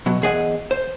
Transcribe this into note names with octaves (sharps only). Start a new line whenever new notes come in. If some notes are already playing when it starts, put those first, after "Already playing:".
B2 F#3
E2 G#4 D#5 F#5
C5